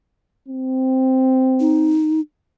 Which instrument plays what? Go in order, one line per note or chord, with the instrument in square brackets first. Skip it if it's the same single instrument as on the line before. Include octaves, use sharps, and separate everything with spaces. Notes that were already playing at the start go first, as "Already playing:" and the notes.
[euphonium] C4
[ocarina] D#4